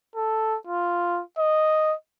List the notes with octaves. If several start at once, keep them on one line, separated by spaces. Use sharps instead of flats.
A4
F4
D#5